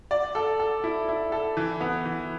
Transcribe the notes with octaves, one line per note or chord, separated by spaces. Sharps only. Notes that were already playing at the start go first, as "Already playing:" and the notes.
D5
A4
A4
E4
E4
A4
E3
B3
E3